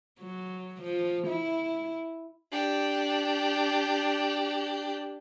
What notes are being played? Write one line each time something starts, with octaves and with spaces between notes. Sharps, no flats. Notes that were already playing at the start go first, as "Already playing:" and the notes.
F#3
F3
E4
D4 G4